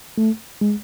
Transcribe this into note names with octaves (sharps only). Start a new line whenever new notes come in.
A3
G#3